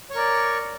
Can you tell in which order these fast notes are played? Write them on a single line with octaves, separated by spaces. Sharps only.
C#5 C#6 A#4 D5